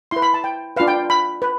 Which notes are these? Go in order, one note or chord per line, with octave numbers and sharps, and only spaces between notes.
E4 B4 C6
B5
A5
G5
D4 F4 B4 F5
G5
B5
B4